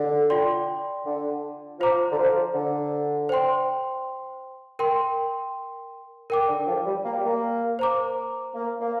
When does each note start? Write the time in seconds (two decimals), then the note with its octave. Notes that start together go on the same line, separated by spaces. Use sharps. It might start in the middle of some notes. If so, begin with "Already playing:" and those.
Already playing: D3
0.30 F4 D5 G5 C6
1.05 D3
1.79 F3 F4 C5 A#5 D6
2.11 D3
2.17 F3
2.54 D3
3.29 C5 G5 C6
4.79 A#4 G5 C6
6.30 A#4 G5 D6
6.48 D3
6.67 F3
6.85 G3
7.04 A#3
7.15 G3
7.25 A#3
7.79 C5 A#5 D6
8.55 A#3
8.80 A#3